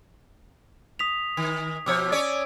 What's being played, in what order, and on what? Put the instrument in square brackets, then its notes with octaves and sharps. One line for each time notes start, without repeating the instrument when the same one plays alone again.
[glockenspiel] D#6 B6 F7
[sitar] D#3
[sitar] B2 F3 C#5 [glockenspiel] D6 E6
[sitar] C#4 C#5 D5